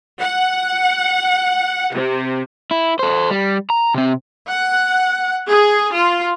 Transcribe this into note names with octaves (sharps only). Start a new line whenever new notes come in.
F#5
C3
E4
A4 C5
G3
A#5
C3 C4
F#5
G#4
F4